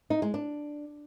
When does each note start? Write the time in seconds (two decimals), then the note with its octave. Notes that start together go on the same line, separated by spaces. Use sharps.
0.10 D#4
0.22 G#3
0.34 D4